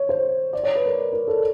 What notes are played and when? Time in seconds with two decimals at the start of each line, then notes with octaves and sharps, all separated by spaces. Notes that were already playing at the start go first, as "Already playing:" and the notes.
Already playing: C#5
0.09 C5
0.53 D5
0.63 C#5
0.75 B4
0.86 A#4
1.13 A#4
1.28 A4